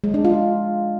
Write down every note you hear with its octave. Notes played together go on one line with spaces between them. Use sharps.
G#3
D4
F4